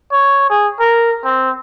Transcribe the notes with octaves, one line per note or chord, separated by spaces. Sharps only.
C#5
G#4
A#4
C4